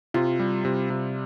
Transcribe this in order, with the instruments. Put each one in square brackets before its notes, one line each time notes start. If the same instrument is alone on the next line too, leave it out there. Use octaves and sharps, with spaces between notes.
[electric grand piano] C3 [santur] F4
[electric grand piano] G3
C3
C3